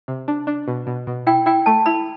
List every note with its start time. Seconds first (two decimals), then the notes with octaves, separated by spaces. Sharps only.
0.08 C3
0.28 D4
0.47 D4
0.68 B2
0.87 B2
1.07 B2
1.27 E4 G5
1.46 E4 G5
1.66 A3 A5
1.86 E4 B5